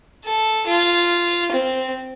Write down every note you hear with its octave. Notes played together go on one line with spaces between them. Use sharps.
A4
F4
C4